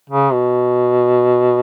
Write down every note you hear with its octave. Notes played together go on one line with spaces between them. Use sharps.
C#3
B2